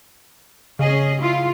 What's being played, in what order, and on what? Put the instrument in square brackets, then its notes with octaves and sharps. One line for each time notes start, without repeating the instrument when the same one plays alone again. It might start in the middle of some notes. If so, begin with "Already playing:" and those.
[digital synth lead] C#3 [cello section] C#4 G#4 D#5
[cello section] E4 F4